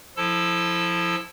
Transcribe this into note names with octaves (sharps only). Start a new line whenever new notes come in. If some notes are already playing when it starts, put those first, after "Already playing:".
F3 E4 A4 A5 E6